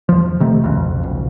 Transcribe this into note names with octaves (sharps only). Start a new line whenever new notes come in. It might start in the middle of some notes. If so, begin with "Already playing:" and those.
E2 F3
C3 D#3 A3
D#1 B1 F2 C#3
D#1 B1